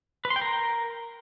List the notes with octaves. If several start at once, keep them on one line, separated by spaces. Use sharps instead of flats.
B4
C6
G5
A#4